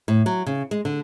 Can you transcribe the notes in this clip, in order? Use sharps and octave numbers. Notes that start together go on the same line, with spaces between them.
A2
F#3
C#3
G#3
D3